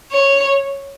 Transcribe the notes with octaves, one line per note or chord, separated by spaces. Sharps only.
C#5